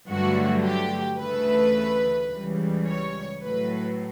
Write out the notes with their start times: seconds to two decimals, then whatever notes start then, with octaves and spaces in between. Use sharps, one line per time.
0.08 G2 D3 F#3 A3 F#4
0.64 G4
1.19 D2 C#3 E3 A3 B4
2.30 C#2 C#3 E3 G3
2.86 C#5
3.42 A2 F#3 A3 B4